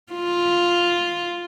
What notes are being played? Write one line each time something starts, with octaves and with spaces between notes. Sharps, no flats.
F4